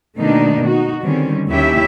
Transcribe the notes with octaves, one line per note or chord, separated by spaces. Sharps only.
B2 D#3 A3 A#3 D4 D#4
D#4 F#4
D3 D#3 G3 C4 C#4
D#2 C#4 E4 G4 E5